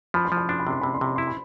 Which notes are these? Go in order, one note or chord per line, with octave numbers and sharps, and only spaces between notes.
F3 B5
C6
F3
B5
D4 C6
B5
C3 C6
C3 B5
C6
C3 B5
E4 C6
B5